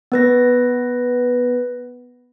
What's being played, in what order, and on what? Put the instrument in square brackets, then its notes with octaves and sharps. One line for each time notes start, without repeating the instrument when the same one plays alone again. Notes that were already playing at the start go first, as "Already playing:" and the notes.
[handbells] B3 B4 A#6